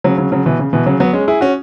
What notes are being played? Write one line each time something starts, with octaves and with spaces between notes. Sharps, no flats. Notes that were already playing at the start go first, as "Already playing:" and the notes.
C#3 F#3
C#3 F#3
C#3 F#3
B2 E3
C#3
B2 E3
C#3 F#3
F#3 B3
G#3 C#4
E4 G#4
C#4 F#4